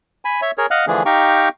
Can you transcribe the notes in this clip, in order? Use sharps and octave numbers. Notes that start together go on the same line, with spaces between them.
G#5 B5
C#5 E5
G#4 A#4 C#5
D#5 F5 F#5 F6 F#6
D3 E3 F3 A3 D4 G#4
D#4 G4 F5 G5 A#5 C#6